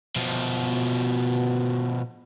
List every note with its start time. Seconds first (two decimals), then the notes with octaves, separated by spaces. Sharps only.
0.16 B2 F3